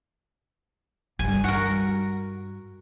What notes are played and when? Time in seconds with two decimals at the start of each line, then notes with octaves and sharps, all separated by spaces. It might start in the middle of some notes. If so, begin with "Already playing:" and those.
1.19 G2 G3 G#5
1.44 F#4 A#4